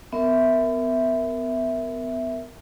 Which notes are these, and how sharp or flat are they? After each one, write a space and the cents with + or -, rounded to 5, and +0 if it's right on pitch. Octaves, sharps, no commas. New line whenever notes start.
B3 +35 A#4 +0 E5 +0